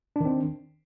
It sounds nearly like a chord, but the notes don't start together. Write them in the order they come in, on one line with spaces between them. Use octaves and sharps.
D4 D#3 C4